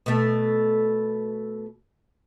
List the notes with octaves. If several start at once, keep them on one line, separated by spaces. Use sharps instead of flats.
B2 A3